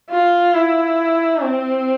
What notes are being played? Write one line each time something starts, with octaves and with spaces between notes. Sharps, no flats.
F4
E4
C4